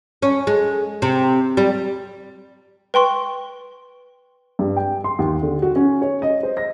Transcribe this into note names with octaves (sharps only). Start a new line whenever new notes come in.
C#4
G#3
C3
G3
B4 G5 C6 C#6
G2
G5
C6
D#2
D3
F#4
C#4
C#5
D#5
C5
A#6